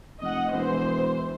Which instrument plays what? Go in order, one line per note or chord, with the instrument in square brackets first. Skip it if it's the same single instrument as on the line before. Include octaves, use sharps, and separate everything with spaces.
[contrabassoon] F1 [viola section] D#5 F#5
[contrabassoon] E1 [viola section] E3 C5